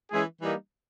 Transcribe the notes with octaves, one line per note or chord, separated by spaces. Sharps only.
E3 G#3 C#4 E4 G#4
E3 G3 A#3 D#4